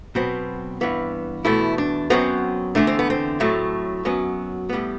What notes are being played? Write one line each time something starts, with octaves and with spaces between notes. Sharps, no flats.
B2 F#3 B3 C4
G2 E3 B3
E2 B2 A3 E4
D4
F#2 F#3 B3 C4
E2 D3 A3 D4
C4
B3
C4
A2 F#3 A3
F#2 F#3 B3
A2 G3 B3